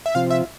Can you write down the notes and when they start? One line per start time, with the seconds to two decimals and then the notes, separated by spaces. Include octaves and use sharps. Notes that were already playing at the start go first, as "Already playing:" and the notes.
0.06 E5
0.15 C3 F3 C4 F4 F5
0.30 E5